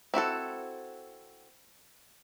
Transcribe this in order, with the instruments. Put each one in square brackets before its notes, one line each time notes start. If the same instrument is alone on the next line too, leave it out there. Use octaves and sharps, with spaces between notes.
[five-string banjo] C4 E4 F#4 A4